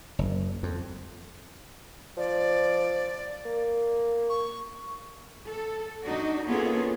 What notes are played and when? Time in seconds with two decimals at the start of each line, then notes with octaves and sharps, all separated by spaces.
0.19 F#1
0.63 F2
2.18 F3 D5
3.46 A#3
4.30 C#6
5.48 A4
6.03 D4 D#4 F#4
6.45 A#3 B3 C#4 F4 G#4 A4